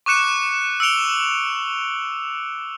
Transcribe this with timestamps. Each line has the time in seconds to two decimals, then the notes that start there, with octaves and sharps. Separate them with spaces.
0.06 C#6 D6 F#6 C#7 E7
0.80 E6 C#7 D7 F7 G7